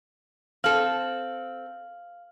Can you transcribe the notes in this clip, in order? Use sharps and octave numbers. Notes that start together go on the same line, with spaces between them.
C4 A4 F5 F6 F#7